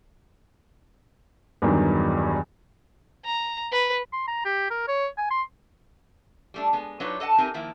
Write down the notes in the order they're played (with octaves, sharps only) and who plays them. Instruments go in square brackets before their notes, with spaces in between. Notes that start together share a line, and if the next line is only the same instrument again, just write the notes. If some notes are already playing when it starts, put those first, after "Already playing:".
[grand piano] E2 G2 D#3 F#3
[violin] A#5
B4
[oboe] C6
A#5
G4
A#4
C#5
G#5
C6
[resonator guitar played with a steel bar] G3 A3 D4
G#3 B3
F#3 D4 D#4 F4 B4 C#5
A4 D#5 F#5 A5
C4 D#4 E4 G4 A#4 G#5
D#3 F3 A#3 E4